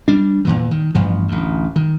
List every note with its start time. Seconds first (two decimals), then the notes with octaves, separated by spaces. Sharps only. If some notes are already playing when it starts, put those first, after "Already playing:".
0.08 G3 D4
0.45 E2 A#2 E3
0.71 D#3
0.95 A1 G2 F3
1.28 A1 D2
1.76 D#3